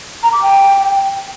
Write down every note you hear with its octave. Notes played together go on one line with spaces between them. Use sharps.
A#5
D6
G5